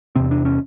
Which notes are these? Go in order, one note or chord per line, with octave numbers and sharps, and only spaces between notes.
E2 C3 C4
D4
C#4